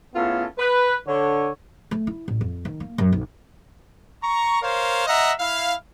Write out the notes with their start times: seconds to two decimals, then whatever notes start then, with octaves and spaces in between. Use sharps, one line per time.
0.15 A2 B3 C#4 F4 G#4 A4
0.58 B4
1.07 D3 C#5
1.91 A3
2.07 E4
2.28 A1
2.41 F2
2.65 D#3
2.80 A#3
2.98 F#2
3.12 B1
4.23 A#5 C#6
4.61 A#4 C5 C#5 F5
5.07 D#5 E5 F#5 A#5
5.39 E4 F5